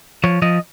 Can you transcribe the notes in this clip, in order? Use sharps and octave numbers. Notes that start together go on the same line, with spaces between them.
F3 C#5
F3 D#5